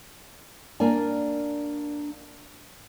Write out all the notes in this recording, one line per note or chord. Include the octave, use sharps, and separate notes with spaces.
A#3 D4 A#4 D5 G#5